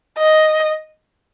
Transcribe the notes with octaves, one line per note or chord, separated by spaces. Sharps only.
D#5